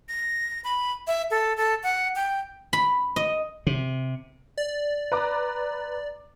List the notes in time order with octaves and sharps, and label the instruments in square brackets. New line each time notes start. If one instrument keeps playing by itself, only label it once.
[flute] A#6
B5
E5
A4
A4
F#5
G5
[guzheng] B5
D#5
[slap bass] C3
[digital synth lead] D5
[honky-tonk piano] B4 A#5 D6